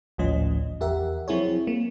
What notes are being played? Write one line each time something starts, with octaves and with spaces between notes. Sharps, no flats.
G#1 D2 A2 F3 C#4 D#5
E2 G4 A#4 E5 F#5
F3 F#3 C4 E4 G#4 C#5
A#3